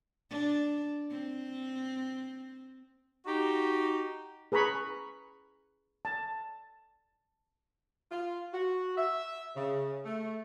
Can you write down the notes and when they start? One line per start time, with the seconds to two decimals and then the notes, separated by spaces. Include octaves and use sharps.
0.31 D4
1.11 C4
3.25 D#4 F#4 G4
4.52 G#4 B4 A#5 B5 C#6
6.05 A5
8.12 F4
8.53 F#4
8.97 E5
9.55 C#3
10.05 A3